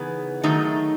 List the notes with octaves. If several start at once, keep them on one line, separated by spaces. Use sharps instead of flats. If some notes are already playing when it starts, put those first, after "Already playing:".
Already playing: C#3 E3 B3 D#4 G#4
D#3 F#3 A3 D#4